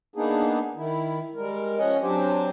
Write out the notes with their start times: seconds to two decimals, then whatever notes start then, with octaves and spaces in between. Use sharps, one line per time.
0.16 A#3 B3 D4 D#4 G#4
0.76 D#3 E4
1.35 G3 G#3 A#4
1.78 F3 C#4 C#5 D#5 F#5 G#5
2.02 F#3 C4 D4 G4 C5 G#5